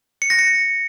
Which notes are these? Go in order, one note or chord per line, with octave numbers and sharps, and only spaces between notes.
C#7
A#6
C#7